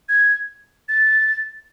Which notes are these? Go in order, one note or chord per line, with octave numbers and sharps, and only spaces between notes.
G#6
A6